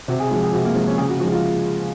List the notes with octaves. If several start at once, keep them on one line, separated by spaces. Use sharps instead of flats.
C3 F#4
G#4
F3 G#3 F#4
G#4
C3 F#4
A#3
F3 G#3
C#4
C#3 G#4
F#4
F3 G#3 F#4
F4